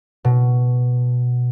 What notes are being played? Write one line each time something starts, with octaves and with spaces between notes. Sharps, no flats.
B2